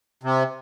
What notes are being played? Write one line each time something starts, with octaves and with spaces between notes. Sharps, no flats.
C3